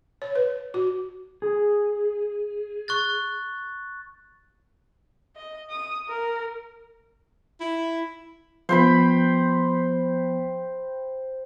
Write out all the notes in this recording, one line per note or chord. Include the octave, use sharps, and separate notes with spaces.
C#5
B4
F#4
G#4
C#6 F#6 A6
D#5
D#6
A#4
E4
F3 B3 C5 G5 B5